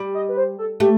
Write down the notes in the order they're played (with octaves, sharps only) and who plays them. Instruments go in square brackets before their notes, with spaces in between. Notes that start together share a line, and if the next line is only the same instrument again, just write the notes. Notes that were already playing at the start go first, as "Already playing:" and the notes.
Already playing: [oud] G3
[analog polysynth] D#5
B4
C5
A4
[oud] A3 [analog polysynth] G4